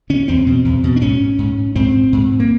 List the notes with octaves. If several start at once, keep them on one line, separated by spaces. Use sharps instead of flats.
D3 C#4
E2 C4
B2
E2
B2
D4
G#2 C#4
G#2
G#2 C4
G#2
A#3